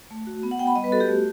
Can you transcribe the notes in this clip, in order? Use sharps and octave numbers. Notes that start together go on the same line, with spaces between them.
A3
F#4
B3
F#5
B3 G5
B5
G3 D#5
B4
F#4 A4
G4
A3